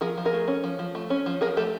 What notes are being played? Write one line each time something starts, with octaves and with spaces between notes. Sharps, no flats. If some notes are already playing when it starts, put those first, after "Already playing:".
F3 G#4 A#4
F3
G#4 A#4
A3
C#4
F3
F3
A3
C#4
F3
F3 G#4 A#4
A3 G4 A4